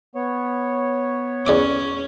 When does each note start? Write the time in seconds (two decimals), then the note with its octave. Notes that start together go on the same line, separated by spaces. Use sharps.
0.15 B3 C#5
1.47 E2 C#4 D5 D6